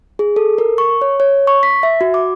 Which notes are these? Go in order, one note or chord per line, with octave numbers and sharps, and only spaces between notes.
G#4
A4
A#4
C#6
C#5
C#5
C#6
B6
E5
F#4
D6